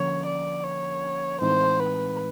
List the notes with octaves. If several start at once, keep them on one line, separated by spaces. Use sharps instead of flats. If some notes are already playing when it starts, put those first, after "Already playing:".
Already playing: D3 F3 A#3 C#4 C#5
D5
C#5
A2 E3 G#3 C4 D#4 C5
B4